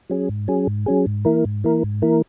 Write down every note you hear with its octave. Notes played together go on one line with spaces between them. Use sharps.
F#3 C#4 G#4
G#2
F#3 C#4 G#4
G#2
F#3 C#4 G#4
G#2
E3 A#3 E4 A#4
G#2
E3 A#3 E4 A#4
G#2
E3 A#3 E4 A#4